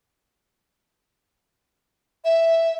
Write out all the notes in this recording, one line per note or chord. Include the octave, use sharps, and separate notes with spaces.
E5